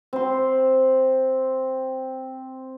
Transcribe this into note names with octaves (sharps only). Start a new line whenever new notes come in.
C4 C6